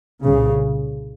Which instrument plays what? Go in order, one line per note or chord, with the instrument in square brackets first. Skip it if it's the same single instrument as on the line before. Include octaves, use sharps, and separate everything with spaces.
[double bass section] C2 A#2 C#3